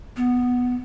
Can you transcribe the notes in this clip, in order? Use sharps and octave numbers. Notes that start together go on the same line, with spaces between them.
B3